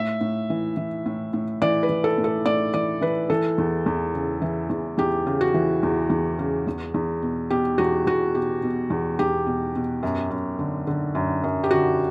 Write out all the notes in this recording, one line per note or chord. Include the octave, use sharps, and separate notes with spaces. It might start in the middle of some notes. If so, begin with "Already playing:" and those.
Already playing: A2 E5
A2
E3
E3
A2
A2
E3 D5
B4
E3
A4
A2
A4
A2 D5
E3 D5
E3 B4
E3 A4
E2
E2
C#3
E3
E2
E2 G4
C#3
F#4
E3
E2
E2
C#3
E2
E2
B2
B2 G4
E2 F#4
E2 F#4
B2 G4
B2
E2
E2 G4
B2
B2
F#2
F#2
D3
D3
F#2
F#2
G4
D3 F#4